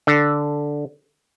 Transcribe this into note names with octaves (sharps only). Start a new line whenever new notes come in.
D3